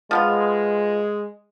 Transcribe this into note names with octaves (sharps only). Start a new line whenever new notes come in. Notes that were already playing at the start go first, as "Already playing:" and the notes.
F3 G#3 B3 F4